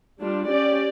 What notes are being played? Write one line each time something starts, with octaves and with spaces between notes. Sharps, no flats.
G3 D4 F4
C#4 G4 D5